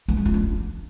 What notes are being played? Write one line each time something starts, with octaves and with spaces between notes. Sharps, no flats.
B3
G#3
F4
D4